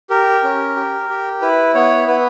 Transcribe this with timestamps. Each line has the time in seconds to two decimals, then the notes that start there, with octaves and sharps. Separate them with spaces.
0.10 G4 A#4
0.43 C#4
0.76 G4
1.10 G4
1.42 E4 B4
1.75 B3 C#5
2.08 B3 B4